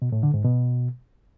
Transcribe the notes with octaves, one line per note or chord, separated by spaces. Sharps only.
B2
A2
D3
G#2
B2